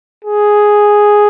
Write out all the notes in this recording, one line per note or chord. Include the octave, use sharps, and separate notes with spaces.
G#4